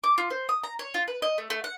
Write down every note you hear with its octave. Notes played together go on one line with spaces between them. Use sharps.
D6
F4
C5
D#6
A#5
C#5
F4
B4
D#5
A3
A3
F#5